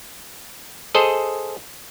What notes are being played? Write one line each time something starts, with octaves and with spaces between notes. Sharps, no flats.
G#4 A4 C5 D#5